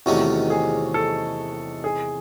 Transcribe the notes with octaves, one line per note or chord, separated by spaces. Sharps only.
E2 C3 D#3 A3 C#4 F#4
G#4
A4
G#4